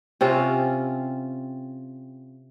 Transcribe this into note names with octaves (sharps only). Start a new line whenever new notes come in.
C3 C4 C#4 F4